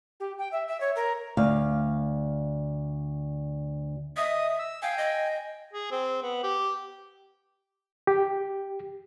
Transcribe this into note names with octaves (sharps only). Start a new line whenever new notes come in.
G4
G5
E5
E5
C#5
A#4
D2 F5
D#5 E5 D#6
E6
F5 G5 G#5
D#5
G#4
C4
B3
G4
G4